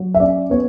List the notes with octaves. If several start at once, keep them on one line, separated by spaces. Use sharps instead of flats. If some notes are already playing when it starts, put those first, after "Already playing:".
Already playing: F#3
E5
C#4 D5
B3 C#5